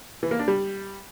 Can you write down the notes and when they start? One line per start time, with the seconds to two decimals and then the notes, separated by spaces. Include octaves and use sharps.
0.23 E3
0.31 A#3
0.39 D4
0.48 G3